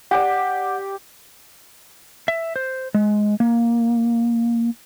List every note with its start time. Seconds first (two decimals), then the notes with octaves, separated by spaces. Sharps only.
0.11 G4 D5 F#5
2.28 E5
2.56 C5
2.94 G#3
3.40 A#3